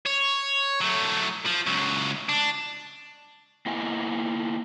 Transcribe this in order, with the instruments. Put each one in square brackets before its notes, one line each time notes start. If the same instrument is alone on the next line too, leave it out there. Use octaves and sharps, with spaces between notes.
[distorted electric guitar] C#5
F#3 A3
F3
C#2 F#3
D4
[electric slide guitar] A#3 B3 E4 D#5 G5 G#5